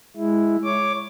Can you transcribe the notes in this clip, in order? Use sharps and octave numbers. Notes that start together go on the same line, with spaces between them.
G#3 E4
C#5 D6